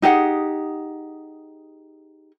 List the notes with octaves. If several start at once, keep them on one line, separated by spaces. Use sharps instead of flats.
D#4 G4 G#4 F#5